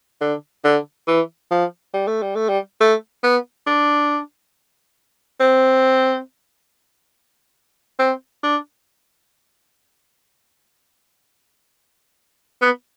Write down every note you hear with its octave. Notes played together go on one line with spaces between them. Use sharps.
D3
D3
E3
F3
G3
A3
G3
A3
G3
A3
B3
D4
C4
C4
D4
B3